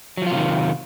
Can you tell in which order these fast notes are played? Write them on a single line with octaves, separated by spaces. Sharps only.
F#3 F3 F4 C3 D#3